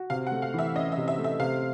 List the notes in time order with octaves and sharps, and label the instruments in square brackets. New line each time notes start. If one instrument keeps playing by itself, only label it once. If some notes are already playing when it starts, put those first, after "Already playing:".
Already playing: [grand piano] F#4
[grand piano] C3 [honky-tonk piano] F5
[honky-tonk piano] F#5
[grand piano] A3
[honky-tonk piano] F5
[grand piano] E3 [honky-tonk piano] E5
[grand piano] C#4 [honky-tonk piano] D#5
[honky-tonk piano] E5
[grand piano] C3
[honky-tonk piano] E5
[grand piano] A3
[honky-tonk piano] E5
[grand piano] C3 [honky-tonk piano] F5